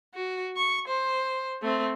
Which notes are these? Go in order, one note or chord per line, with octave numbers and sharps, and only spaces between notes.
F#4
C#6
C5
A3 C4